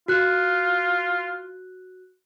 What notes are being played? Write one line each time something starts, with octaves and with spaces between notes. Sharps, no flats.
F4 F#4 F#6